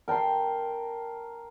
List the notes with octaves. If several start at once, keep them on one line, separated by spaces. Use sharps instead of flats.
A#4 G5 A5 C6